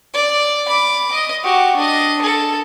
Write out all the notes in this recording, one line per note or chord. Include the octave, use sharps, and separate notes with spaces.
D5
B5 D6
D#5
F#4 G4
D4 D#5
A4